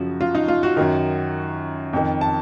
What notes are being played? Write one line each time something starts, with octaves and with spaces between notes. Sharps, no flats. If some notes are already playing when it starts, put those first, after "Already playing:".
Already playing: F#2 C#3 F3 F#4
F4
D#4
F4
F#4
F#2 D#3
F2 D#3
A5